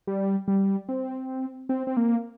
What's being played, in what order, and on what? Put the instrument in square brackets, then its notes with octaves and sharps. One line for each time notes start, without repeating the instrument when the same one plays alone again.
[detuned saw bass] G3
G3
C4
C4
C4
A#3